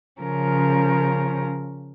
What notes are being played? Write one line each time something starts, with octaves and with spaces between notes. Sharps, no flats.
C#3 F3 C#4 A#4